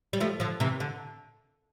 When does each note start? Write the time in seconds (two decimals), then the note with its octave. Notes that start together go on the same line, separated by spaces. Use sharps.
0.13 G3
0.20 F3 A3
0.40 D3 F3
0.60 C3 E3
0.80 D3